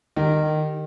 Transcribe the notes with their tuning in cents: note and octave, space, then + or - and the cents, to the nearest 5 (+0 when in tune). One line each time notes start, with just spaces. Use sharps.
D#3 -20 G4 +0